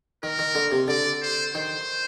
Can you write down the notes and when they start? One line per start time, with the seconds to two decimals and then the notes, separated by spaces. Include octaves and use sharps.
0.23 D#3 A#4
0.39 D#3
0.55 D3
0.72 C3
0.88 D3 D5
1.22 C5
1.54 D#3 C5